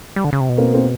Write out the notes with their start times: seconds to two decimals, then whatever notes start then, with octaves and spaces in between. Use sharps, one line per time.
0.16 G3
0.24 D3
0.33 C#3
0.41 C3
0.49 B2
0.58 A#3 C4
0.74 A#3 C4